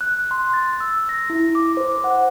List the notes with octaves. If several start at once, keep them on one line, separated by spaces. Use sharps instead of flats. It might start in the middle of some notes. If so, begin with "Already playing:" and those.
F#6
C6
A6
E6
A#6
E4
D6
C5
F#5